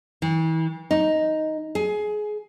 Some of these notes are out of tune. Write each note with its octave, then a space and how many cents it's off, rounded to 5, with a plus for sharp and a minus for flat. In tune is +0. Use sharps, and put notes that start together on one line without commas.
E3 -35
D#4 +5
G#4 +20